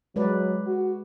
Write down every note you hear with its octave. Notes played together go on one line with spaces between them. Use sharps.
F#3 G#3 B4 D5
F#4